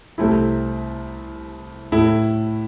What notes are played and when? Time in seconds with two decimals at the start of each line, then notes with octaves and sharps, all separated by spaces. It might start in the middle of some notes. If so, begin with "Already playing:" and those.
0.18 C2 C3 A3 C4 E4
1.92 A2 A3 E4